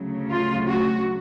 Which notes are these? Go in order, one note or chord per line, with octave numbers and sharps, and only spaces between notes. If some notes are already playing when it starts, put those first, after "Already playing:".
Already playing: D2 C#3 F#3 A3
F4
F#4